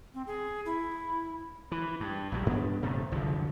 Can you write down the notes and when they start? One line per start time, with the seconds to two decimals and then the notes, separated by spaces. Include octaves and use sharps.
0.14 C4
0.27 G#4
0.66 E4
1.72 E3
2.00 G2
2.32 A#1 F#3 G3
2.46 G2 B3 D4
2.82 D#1 C3 A3
3.12 F#1 C2 D3 F3